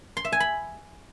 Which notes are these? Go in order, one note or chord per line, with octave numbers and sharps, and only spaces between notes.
C6
E5
G#5
B5